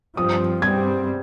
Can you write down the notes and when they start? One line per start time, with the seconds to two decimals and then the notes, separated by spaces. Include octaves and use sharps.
0.17 G2 F3 C4 D#6
0.62 G2 G3 C4 G#6